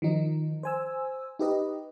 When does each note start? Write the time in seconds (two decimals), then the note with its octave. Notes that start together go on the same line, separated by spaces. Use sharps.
0.02 D#3 F3 D#4
0.63 C5 G#5 E6
1.39 D#4 G4 B4 D#5